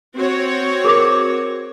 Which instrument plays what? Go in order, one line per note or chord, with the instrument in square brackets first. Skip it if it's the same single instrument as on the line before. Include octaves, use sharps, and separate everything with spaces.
[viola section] C4 F#4 C#5
[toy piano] G#4 A#4 D6